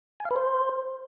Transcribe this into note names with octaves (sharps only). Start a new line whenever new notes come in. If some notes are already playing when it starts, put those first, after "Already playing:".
G#5
F5
B4
C5